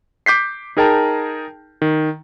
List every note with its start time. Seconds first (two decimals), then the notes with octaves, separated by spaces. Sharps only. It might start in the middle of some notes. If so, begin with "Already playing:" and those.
0.26 D6 G6 B6 C7
0.77 D#4 G#4 A#4 G5 A5 A#5
1.82 D#3